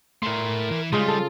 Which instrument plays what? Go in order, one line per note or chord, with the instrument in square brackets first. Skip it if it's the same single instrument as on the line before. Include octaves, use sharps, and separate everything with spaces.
[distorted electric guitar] A3 E4 [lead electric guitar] A#4 C6
[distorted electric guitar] E3 E4
[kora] C#3 G#3 [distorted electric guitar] G3 [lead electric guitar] F4
[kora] A4